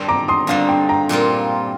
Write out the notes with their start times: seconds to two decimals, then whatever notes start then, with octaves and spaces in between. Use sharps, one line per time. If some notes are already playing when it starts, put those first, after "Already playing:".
Already playing: G2 D3 G3 C4
0.08 A#5 D6
0.28 C6 D#6
0.47 G2 D3 G3 C4 F5
0.69 G5
0.89 G5 A#5
1.09 A#2 G3 C4 F4